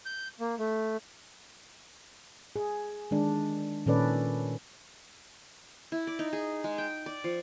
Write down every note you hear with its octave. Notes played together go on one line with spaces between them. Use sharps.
G6
A#3
A3
G#4
D#3 G#3 D4
A#2 D#3 C#4 A4 B4 D5
E4
D5
D#4
G#4
G#3
G5
D5
F3